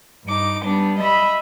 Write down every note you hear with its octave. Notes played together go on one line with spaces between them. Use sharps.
G2 D#4 D6
G3 B3 D4
D#5 E5 B5